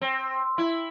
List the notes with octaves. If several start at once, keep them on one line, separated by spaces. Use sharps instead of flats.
C4
E4